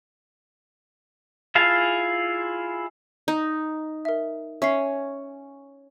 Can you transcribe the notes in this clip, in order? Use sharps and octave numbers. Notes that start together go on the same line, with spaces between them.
E4 F4 G#4 F5 A5
D#4
A#4 E5
C#4 E5 C7